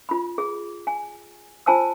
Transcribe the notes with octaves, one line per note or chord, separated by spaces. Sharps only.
F4 B5
G#4
G#5
F4 C5 G#5 A5 E6